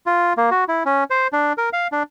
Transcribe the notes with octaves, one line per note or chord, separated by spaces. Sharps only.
F4
A#3
F#4
E4
C#4
C5
D4
A#4
F5
D4